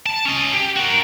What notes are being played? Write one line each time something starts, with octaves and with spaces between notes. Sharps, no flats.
A5
C#4 D#5
G4
F#4 A#4